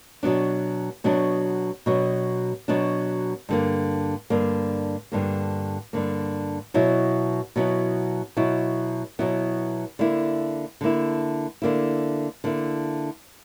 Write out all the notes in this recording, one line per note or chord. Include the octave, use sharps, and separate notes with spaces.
B2 F#3 B3 D4
B2 F#3 B3 D4
B2 F#3 B3 D4
B2 F#3 B3 D4
G2 D3 A#3
G2 D3 A#3
G2 D3 A#3
G2 D3 A#3
B2 F#3 B3 E4
B2 F#3 B3 E4
B2 F#3 B3 E4
B2 F#3 B3 E4
D3 A#3 E4
D3 A#3 E4
D3 A#3 E4
D3 A#3 E4